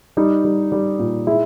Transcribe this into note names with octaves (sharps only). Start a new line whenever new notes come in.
G3 D#4
G3
G3
A#2
G#3 E4